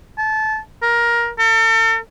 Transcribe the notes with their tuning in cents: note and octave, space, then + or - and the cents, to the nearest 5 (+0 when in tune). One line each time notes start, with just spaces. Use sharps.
A5 -20
A#4 +15
A4 +40